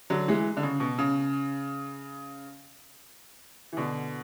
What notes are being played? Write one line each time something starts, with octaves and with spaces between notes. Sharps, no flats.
D3 F#3
E3 G#3
D3
C#3
B2
C#3
E3
B2 D3